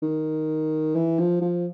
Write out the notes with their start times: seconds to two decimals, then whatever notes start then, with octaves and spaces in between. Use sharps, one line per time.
0.02 D#3
0.95 E3
1.19 F3
1.42 F3